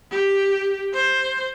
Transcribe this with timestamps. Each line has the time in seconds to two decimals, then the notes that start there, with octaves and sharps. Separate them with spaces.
0.11 G4
0.93 C5